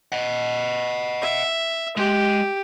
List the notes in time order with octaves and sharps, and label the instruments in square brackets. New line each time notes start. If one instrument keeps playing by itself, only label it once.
[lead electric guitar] D#5 F#5
[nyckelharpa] E5
[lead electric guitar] G#3 [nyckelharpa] G4